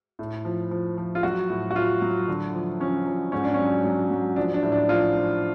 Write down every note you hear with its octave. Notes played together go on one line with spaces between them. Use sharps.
A2
F3
F3
F3
F4
F#3 F#4
A2
F#4
A2 F4
F#3
D3
F3
F3 C#4
F3
G#2 C#4
D4
F#3 C#4
F#3
F#3
F3 D4
D4
A2
D4
F3 F4
F3